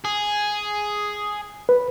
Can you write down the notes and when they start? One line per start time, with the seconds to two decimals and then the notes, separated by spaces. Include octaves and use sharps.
0.05 G#4
1.69 B4